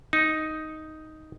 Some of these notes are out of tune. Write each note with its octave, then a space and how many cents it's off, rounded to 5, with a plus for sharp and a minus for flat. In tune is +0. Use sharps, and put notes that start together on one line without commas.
D#4 +5